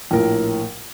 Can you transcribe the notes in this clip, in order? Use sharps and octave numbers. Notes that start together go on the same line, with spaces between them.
A#1 A2 A#4